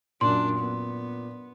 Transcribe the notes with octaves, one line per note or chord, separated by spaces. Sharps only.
F#2 A#2 D4 C6
B3